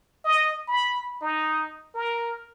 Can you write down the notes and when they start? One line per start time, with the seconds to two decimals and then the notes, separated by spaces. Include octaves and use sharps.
0.25 D#5
0.68 B5
1.22 D#4
1.95 A#4